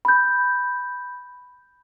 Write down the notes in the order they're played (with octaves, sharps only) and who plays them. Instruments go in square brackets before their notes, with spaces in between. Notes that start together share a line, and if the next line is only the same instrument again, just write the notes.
[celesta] B5 G6